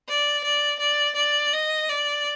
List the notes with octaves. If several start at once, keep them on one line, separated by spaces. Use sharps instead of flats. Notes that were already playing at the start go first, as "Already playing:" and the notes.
D5
D5
D5
D5
D#5
D5